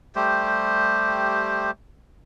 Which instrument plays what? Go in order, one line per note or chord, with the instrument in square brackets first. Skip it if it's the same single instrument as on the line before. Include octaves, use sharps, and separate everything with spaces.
[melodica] G3 A3 G4 C5